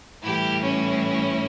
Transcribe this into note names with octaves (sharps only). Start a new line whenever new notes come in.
A2 E3 G3 E4 G4
C#4 E4